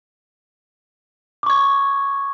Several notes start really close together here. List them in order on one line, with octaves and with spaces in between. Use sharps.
D6 C#6 G#6